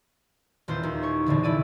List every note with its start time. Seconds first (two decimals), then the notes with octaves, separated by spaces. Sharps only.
0.68 D#1 E2 F4 C5
0.83 D#2
1.02 C#5 C#6
1.26 A#1 F2 D3 E3
1.43 F1 E4 D5 D#7